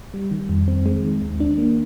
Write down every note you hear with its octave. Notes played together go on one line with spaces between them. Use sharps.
G3
D#3
F2
C4
G#3
D#3
D#2
D4
A#3